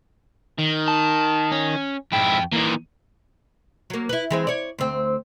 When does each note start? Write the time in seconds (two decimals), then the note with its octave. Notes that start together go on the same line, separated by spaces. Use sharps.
0.58 D#3
0.88 A5
1.52 C#4
2.12 F2 G#2 E4 G5
2.53 A#2 E3 D#4
3.90 F#3 A#3
4.09 E4 B4
4.30 E3 G#3 C4
4.47 C#5 D5
4.78 D2 C4